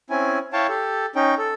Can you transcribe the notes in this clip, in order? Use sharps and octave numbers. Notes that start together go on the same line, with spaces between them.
C4 C#4 E4 G#5
E4 C#5 F5 G5 A5
G4 A4
C#4 D#4 G5
A4